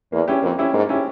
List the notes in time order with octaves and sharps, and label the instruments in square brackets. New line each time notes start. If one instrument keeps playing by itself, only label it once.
[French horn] E2 [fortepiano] A#3
[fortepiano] C#4 E4 G4
[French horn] F2 [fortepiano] A#3
[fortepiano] C#4 E4 G4
[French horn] G#2 [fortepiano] A#3
[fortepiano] C#4 E4 G4